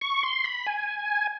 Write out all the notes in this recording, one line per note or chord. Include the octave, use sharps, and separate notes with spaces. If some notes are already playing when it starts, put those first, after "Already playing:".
C#6
C6
B5
G#5